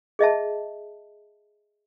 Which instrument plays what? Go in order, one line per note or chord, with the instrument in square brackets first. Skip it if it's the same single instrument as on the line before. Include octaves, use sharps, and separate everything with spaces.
[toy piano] G#4 D#5 E5 A5